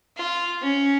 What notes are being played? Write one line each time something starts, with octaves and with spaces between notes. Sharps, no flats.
F4
C#4